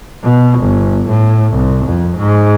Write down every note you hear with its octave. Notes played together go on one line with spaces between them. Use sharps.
B2
G1
A2
C2
F2
G#2